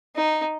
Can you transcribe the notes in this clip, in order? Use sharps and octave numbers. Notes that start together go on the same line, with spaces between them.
D#4